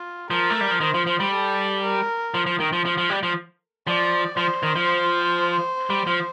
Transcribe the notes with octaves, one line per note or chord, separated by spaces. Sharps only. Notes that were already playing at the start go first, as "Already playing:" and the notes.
Already playing: F4
F3 A#4
A3
G3
F3
D#3 C5
F3
F3
G3
A4
A#4
F3
F3
D#3
F3
F3
F3
G3
F3
F3 D5
F3 C5
D#3
F3
G3
F3